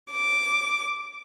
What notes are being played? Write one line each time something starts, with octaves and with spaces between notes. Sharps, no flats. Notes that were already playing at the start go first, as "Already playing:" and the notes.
D6